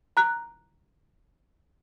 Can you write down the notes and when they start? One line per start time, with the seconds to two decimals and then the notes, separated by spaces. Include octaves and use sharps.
0.17 A#5 F#6